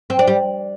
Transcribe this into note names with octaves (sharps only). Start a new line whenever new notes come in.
C4
D4
G3